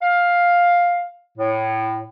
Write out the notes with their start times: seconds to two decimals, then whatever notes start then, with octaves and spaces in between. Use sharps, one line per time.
0.02 F5
1.38 A2